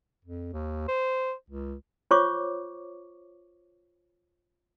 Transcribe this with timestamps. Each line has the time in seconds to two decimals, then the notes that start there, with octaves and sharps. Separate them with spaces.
0.25 F2
0.53 D#2
0.88 C5
1.50 C#2
2.11 F4 C5 C#5 C#6 D6